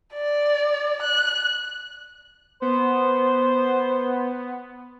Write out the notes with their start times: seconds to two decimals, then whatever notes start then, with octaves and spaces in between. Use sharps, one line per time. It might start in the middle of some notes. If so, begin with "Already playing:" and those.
0.14 D5
1.03 F#6
2.62 B3 C5